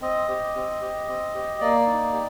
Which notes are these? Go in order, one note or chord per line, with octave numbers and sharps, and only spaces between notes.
C4 D#5
G4
C4
G4
C4
G4
A#3 D5
D#4
G4